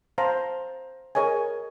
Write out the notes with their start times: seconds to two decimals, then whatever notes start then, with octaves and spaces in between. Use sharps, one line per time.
0.18 C5 F5 A5 A#5
1.15 G#4 A#4 C#5 D#5 G#5